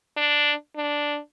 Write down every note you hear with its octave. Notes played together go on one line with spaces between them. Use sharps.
D4
D4